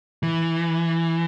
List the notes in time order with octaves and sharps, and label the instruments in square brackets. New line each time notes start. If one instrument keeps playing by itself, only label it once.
[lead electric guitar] E3